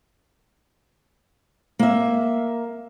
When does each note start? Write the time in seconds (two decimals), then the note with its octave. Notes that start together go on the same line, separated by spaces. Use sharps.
1.79 A#3 E5